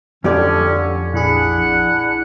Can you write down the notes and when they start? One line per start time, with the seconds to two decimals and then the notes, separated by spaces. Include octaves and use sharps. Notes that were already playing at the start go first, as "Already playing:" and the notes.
0.24 F2 D3 C#4 G4 D5
1.13 A#1 D4 E4 G#4 F#5